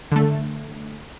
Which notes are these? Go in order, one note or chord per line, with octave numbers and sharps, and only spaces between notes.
D3 A3